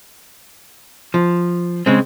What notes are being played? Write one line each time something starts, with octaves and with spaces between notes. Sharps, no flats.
F3
C#3 G#3 C4